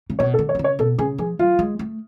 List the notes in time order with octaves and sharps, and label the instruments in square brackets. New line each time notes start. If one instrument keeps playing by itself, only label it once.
[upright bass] C#3
[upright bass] B2 [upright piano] C#5
[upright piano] A4
[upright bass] D3
[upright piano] C#5
[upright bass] D3
C#3
[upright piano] C#5
[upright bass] B2 [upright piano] A4
[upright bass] C#3 [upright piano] G#4
[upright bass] F3 [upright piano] G#4
[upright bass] F#3 [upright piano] F4
[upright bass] G#3
A3